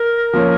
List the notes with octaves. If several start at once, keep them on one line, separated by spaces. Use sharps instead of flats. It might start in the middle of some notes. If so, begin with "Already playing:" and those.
Already playing: A#4
F3 A#3 C#4